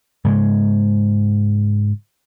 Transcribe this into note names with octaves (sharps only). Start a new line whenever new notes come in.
G#2 C#3 G#3